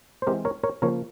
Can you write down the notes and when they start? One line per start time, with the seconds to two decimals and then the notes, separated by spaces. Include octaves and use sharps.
0.22 C5
0.27 E3 G#3 C4 G4 A#4
0.45 A#4 C#5
0.63 A#4 C#5
0.82 C#3 F3 A#3 A#4 C#5